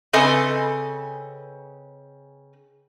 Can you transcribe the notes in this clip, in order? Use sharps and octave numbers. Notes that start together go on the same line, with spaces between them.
C#3 C4 A4 B4 D#5 G#5